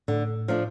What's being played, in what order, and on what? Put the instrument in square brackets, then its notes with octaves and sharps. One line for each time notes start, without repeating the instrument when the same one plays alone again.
[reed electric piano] A2 [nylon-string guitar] D3
[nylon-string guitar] F3 A3 D4